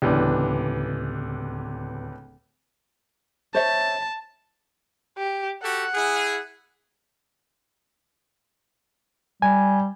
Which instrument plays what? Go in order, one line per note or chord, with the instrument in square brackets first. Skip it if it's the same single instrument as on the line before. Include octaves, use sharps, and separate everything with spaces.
[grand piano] D1 B3 G4 [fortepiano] C#2 E3 D4
[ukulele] C5 C#5 E5 [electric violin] A5
[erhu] G4
[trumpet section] F#4 G4 A4 [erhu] F#5
[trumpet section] E4 G#4
[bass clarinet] G3 [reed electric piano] G#5